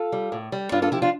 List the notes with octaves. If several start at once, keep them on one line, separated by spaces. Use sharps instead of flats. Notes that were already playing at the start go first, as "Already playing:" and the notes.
Already playing: F4 A4
G3
A2
G3
G2 D4 F4
F4 A4
F3 E4 G4
D4 F4